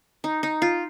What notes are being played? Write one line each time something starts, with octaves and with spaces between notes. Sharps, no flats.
D#4
D#4
F4